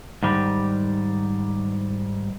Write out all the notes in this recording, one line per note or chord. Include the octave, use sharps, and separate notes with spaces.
G#2 D#3 G3